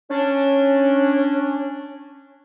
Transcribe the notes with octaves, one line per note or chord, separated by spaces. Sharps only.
C#4 D4